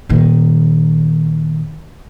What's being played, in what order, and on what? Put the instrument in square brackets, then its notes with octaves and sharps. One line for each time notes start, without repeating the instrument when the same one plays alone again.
[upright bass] A#2 D#3